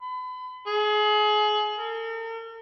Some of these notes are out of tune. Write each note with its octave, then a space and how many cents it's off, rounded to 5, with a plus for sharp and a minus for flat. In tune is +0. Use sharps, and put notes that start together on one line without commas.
B5 +35
G#4 +30
A#4 -45